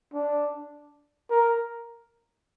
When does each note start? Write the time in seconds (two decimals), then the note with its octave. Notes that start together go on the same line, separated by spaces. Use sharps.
0.14 D4
1.30 A#4